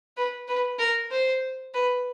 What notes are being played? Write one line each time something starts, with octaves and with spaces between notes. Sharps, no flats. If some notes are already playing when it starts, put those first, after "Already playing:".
B4
B4
A#4
C5
B4